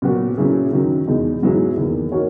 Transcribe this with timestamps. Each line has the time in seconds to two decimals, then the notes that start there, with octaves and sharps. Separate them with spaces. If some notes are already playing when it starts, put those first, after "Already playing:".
0.02 A#2 F#3 B3 F#4
0.37 A#2 F#3 C#4 E4 G#4
0.72 F#2 D#3 F#3
1.07 E2 B2 G#3 D#4
1.42 G#2 F#3 B3 E4 G#4
1.77 E2 D#3 A#3
2.12 A#3 D#4 F#4 C#5